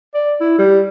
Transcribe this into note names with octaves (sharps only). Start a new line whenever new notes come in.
D5
E4
G3